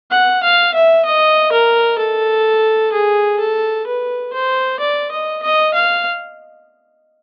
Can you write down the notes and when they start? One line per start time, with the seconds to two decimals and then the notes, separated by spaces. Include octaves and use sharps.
0.11 F#5
0.43 F5
0.74 E5
1.05 D#5
1.52 A#4
1.98 A4
2.92 G#4
3.39 A4
3.86 B4
4.33 C5
4.79 D5
5.11 D#5
5.42 D#5
5.74 F5